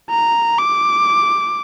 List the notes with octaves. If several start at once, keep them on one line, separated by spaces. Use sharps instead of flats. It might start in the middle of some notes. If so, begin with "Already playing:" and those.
A#5
D6